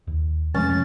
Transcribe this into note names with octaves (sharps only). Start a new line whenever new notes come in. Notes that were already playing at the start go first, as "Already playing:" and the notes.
D#2
F2 C3 G#3 A3 C#4 A6